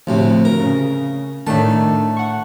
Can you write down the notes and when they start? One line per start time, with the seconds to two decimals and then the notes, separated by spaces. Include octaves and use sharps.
0.07 D2 A2 C3 F3
0.45 A#4
0.60 C#3
1.47 A2 D#3 A3 D4 A5
2.17 F#5 C#6